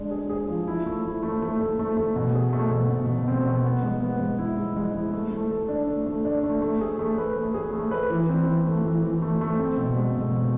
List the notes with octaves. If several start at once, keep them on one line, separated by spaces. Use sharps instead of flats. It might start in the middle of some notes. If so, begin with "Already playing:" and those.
Already playing: G#3 D4
G#4
G#4
F3
E4
A3
E4
A3
A3
A3
A3
A3
B2
G#4
A3
B2
B2
B2
C4
B2
B3
G#3
B3
G#3
E4
G#3
G#3
E4
A3
A3
A4
D4
A3
A3
D4
A3
A3
G#4
A3
B4
A3
G#4
A3
B4
E3
C4
E3
A3
E3
E3
A3
A3
C4
B2
G#3
B2
B2